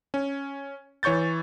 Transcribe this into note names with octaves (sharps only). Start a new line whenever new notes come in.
C#4
E3 C#5 C#6 G6 A6